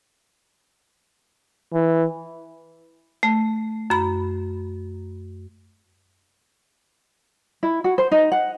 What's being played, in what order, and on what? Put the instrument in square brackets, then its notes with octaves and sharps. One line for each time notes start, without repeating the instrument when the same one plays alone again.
[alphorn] E3
[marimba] A3
F#2 B5
[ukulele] E4
F#4
C5
D#4
F#5